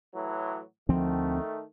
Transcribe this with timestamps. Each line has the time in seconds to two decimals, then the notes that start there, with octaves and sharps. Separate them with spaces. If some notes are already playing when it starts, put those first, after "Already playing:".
0.14 A2 E3 F#3
0.89 D2 D#3 F3 A3 C4